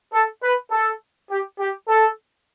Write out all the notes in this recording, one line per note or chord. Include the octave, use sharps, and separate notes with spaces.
A4
B4
A4
G4
G4
A4